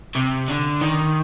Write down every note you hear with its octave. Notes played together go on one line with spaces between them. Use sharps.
C3
D3
D#3